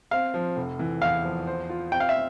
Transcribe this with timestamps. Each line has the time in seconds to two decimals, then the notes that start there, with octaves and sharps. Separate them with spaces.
0.11 C4 F5
0.34 F3
0.56 F1
0.79 E3
1.02 E2 F5
1.24 F3
1.47 C5
1.69 F4
1.91 C4 G5
2.00 F5
2.09 E5